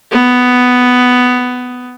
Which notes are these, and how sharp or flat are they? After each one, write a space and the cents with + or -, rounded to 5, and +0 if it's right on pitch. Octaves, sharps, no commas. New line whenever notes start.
B3 +10